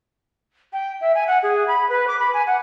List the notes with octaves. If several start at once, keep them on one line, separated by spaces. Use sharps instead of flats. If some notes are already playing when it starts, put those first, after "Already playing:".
G5
E5
G#5
F#5
G#4
B5
B4
D6
B5
G#5
F#5